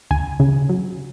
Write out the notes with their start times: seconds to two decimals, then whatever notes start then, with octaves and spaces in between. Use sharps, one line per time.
0.11 D2 G#5
0.40 C#3
0.69 F#3